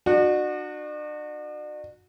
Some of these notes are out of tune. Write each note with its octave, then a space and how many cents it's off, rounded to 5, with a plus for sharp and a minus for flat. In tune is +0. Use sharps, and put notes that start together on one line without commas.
D4 +40 F#4 -20